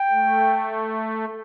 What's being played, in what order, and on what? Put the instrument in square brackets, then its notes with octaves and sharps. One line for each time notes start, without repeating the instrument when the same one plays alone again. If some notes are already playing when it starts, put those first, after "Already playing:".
Already playing: [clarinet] G5
[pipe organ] A3